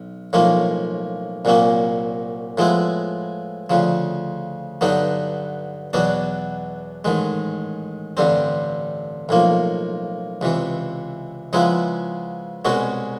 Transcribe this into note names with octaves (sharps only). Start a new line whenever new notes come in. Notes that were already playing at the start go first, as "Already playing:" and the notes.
Already playing: B1
B1 A2 F3 A#3 C#4
C2 A#2 F#3 A#3 C#4
A2 F3 G#3 B3 E4
D2 C#3 F3
G2 D3 F#3 B3 D#4
E2 B2 F#3 B3 D4
A1 G#2 D#3 G#3
A1 G2 D3 G3 C4
B1 A2 F3 A#3
C#2 C3 E3
C#3 F3 G#3 B3 E4
C2 B2 G#3 C#4 F#4